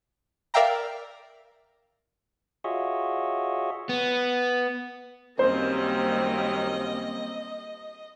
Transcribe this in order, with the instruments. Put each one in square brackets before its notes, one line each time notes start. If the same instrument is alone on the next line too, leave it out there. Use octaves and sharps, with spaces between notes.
[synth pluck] A#4 D5 E5 F5 G5 A#5
[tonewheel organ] F4 F#4 G#4 C#5 D#5 E5
[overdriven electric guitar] B3
[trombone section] F#2 D#3 C#4 [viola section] G3 A#3 C4 [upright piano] C5 [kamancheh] D#5